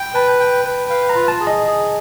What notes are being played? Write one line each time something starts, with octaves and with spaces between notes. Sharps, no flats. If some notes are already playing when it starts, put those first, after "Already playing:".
Already playing: G5 B5
B4 A5
G5
B4
F5
A#5
F4
A5
G#4
D#5
G#4